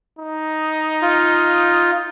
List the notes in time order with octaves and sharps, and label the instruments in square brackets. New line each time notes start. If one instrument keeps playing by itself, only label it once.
[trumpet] D#4
[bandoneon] F4